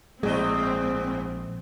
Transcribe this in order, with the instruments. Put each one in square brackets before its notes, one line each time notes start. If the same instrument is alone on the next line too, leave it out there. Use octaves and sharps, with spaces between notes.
[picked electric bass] A#1 G#3 [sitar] G#2 G#4 D#5 [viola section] C4